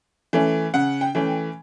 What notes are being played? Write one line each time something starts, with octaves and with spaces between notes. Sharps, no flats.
E3 A3 C#4
C#3 F#5
G5
E3 A3 C#4